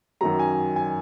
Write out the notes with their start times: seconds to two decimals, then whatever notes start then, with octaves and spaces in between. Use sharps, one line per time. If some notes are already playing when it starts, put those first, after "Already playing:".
0.21 F#2 D#3 F#3 A#5
0.39 G#5
0.76 G#5